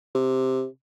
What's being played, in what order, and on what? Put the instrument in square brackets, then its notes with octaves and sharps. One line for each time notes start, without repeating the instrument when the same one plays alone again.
[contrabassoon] C3